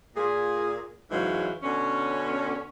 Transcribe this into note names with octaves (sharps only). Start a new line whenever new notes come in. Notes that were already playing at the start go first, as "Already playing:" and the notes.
A#2 G#4
G#2 C#3 E3 F#3 G#3
B2 D3 C#4